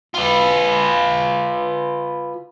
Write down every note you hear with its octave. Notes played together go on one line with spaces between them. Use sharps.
F4 B4